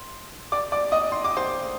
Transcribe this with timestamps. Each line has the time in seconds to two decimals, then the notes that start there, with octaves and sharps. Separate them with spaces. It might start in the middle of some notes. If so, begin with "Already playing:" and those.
Already playing: C6
0.52 D5 D6
0.72 D5 D6
0.92 D#5 D#6
1.12 C6
1.24 D6
1.37 C5 C6